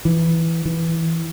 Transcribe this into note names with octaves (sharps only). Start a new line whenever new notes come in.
E3
E3